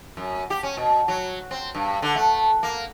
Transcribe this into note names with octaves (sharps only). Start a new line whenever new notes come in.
F#2
G4
C#4
B2
F#3
C4
G2
D3
A3
A#3